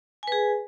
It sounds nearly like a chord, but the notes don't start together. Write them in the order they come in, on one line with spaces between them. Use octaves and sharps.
G#5 B4 G#4